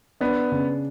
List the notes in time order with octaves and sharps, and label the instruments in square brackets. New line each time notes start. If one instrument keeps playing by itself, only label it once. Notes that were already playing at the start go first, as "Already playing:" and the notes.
[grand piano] B3 [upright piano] D4
[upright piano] C#3